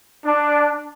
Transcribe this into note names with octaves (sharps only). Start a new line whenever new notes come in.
D4